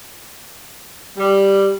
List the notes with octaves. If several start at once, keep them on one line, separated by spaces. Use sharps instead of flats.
G3